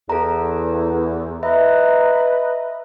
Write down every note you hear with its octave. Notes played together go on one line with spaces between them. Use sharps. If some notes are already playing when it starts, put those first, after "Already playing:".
E2 A4 A#5
B4 D#5 E5 A#5